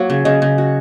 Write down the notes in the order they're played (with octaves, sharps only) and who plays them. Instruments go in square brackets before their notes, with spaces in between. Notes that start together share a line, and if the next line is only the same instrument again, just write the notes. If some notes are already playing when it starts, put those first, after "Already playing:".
Already playing: [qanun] F#3 A#3 [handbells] C#5
[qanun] C#3
[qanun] C#3 [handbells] D#5
[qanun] C#3
F#4